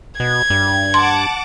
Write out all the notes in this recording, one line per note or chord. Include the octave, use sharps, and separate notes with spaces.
B2 G#6
G2
F#5 A5 C6 D6